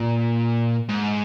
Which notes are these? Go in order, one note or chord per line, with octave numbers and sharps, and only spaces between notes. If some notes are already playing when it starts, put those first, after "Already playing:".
Already playing: A#2
G#2